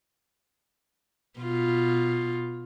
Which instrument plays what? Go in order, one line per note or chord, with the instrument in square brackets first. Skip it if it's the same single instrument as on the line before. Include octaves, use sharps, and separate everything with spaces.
[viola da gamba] B2 F4